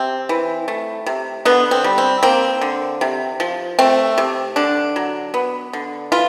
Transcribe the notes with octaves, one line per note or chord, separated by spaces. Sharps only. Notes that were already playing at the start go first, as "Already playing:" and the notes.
Already playing: C3 C4
E3
A3
C3
D3 B3
C4
G3
C4
A#3 C4
D3
C3
F3
A3 C4
C3
D3 D4
F#3
B3
D3
E3 F4